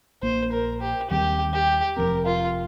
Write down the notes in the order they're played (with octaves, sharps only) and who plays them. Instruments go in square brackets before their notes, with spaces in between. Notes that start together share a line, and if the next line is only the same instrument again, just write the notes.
[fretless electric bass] A#1 A#2 A#3 [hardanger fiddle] C5
[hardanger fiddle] A#4
G4
[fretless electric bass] D#2 D#3 G3 C4 [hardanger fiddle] G4
[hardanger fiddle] G4
[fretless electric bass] F1 F2 F3 C4 [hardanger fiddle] A#4
[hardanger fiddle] F4